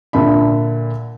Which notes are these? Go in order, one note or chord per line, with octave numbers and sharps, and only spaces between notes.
A#2 D3 E5 B5